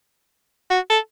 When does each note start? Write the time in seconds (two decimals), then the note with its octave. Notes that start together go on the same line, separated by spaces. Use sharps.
0.71 F#4
0.90 A4